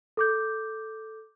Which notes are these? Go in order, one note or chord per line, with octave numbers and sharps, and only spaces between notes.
A4 D6 G6